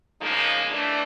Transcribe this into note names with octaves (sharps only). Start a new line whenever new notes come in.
C#3 F3 G#3 A#3 D#4
E3 A3 D4